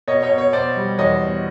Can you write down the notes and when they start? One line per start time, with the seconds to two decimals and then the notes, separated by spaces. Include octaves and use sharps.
0.08 B2 C#5 D#5
0.23 C#5 D#5
0.30 B2
0.38 C#5
0.53 B2 C5 D5
0.76 G3
0.98 E2 C#5 D#5
1.21 B2